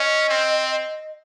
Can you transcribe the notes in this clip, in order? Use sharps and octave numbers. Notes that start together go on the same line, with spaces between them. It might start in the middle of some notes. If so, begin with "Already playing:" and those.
Already playing: C#4 D#5
C4